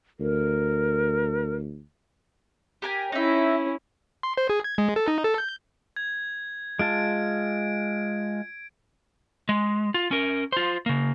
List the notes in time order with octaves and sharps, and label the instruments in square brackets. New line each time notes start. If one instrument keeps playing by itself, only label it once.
[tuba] D2 [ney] A#4
[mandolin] G4 A#4 G#5
[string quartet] C#4 E4 [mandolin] D#4 E5
[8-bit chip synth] C6
C5
G#4
G#6
G#3
A4
D#4
A4
G6
[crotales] G#6
[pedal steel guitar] G#3 F4 A5 [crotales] D7
[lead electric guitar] G#3
F4
C#4 A#4
F4 C5
C#3 A#3